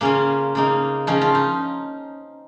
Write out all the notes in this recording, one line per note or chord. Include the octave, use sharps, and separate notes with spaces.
C#3 A#3 C#4 F4
C#3 A#3 D#4
C#3 F3 C#4 D#4
F4
D#4